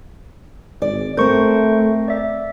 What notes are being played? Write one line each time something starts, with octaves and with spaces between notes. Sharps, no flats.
G#1 D5
A3 C4 A#4 C5 C#6
D5 E5